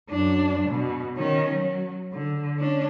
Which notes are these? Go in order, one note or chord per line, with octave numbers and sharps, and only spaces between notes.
F#2 D4
B2
D#3 C#4
F#3
D3
C#4 D4